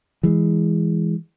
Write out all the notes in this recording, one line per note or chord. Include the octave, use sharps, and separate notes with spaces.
E3 G#3